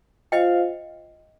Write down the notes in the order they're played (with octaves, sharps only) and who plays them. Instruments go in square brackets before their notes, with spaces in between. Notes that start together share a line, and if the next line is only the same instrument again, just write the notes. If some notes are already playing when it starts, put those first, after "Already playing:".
[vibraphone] F4 C5 F5 [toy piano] D#5 G5